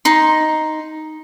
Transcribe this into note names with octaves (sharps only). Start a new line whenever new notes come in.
D#4 C6